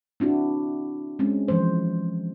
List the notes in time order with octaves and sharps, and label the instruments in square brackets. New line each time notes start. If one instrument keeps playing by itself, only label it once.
[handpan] C4 D4 E4 F#4
G#3 C4 C#4
E3 F3 G#3 C5